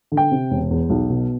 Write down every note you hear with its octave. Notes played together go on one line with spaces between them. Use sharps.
D3
G5
C3
E1
E2
B1
B2